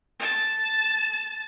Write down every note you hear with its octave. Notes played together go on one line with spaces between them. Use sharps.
A5